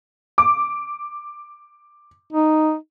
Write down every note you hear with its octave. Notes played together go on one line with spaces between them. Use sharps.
D6
D#4